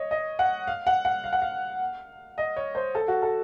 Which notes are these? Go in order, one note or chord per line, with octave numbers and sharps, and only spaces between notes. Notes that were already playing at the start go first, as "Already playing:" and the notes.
Already playing: C#5 D#5
D#5
F#5
F5
F#5
F#5
F5
F#5
F5
D#5
C#5
C5
A4
F#4
A4